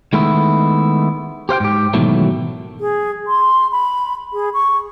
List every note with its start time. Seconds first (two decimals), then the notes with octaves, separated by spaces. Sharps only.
0.13 D#3 G#3 A3 B3 E4
1.49 G4 C5 F5 G5
1.60 G#2 G4
1.93 G#2 B2 D#3 E3 F#3 A3
2.80 G#4
3.27 C6
3.72 B5
4.33 G#4
4.54 C#6